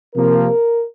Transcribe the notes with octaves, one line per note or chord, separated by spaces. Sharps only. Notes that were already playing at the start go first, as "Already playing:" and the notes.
C3 F3 A#3 A#4